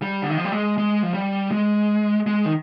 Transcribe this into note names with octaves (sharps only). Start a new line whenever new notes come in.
G3
D3
D#3
F3
G3
G#3
G#3
F3
G3
G#3
G#3
D#3